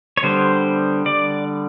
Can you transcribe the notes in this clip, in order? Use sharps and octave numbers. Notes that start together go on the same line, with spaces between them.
C#5
D3 G3 B3 C5
D5